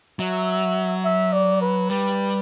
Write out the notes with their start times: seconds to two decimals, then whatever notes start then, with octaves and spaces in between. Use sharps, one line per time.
0.19 F#3 E5
1.05 E5
1.33 D5
1.61 B4
1.90 G3 B4